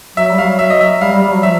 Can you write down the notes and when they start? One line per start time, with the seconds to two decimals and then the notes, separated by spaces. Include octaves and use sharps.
0.17 F#3 E5
0.31 G3
0.38 F5
0.44 F#3
0.59 E5
0.70 D#5
0.81 E5
1.01 G3 F5
1.12 G3
1.22 G3
1.33 F#3
1.43 F3 E5